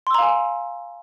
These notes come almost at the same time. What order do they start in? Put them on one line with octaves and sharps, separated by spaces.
C6 E6 A#5 F5 G#5